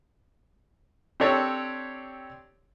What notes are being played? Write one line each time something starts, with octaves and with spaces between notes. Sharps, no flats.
C4 D4 G4 A4 C#5 D5